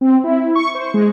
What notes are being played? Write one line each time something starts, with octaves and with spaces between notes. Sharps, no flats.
C4
E4
C#6
C5
G#3